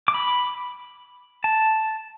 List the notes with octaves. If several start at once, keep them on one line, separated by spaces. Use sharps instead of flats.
D6
B5
A5